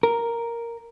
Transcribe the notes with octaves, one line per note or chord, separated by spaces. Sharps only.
A#4